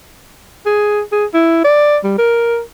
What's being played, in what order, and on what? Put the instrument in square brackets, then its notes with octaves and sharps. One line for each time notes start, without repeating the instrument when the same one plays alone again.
[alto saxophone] G#4
G#4
E4
D5
G3
A#4